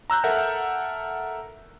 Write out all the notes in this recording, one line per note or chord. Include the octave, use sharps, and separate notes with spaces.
A#5 E6 F#6 G6
A4 A#4 E5 F#5